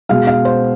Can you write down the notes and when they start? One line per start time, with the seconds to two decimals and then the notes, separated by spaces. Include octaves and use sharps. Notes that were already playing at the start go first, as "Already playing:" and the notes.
0.09 B2 G#3 F5
0.27 F5
0.45 C5